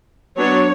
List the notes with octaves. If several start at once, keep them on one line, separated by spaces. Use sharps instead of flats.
F#3 B3 D4 C#5